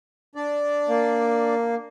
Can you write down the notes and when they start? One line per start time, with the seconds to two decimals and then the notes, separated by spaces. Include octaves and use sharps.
0.35 D4 D5
0.88 A#3